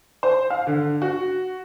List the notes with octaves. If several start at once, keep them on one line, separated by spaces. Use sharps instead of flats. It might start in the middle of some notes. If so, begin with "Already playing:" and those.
C5
F5
D3
F#4